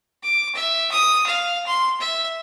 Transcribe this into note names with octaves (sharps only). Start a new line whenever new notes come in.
D6
E5
D#6
F5
C6
E5